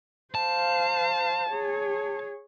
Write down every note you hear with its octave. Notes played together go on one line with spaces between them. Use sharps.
C5 F5 A5
G#4 C#5